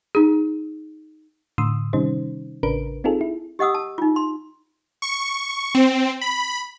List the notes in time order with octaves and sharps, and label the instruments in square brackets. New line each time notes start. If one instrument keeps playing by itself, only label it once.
[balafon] D#4 G#4
[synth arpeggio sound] A2 D3 C6 D#6 E6
C3 D#3 G3 C#4 D#4 C5
A1 C#3 D4 A#4 B4 D7
C4 D#4 F4 G#4 A4
E4
[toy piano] G4 D#5 F#5 D#6 E6
A5
D#4 F4
C6
[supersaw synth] C#6
C4
B5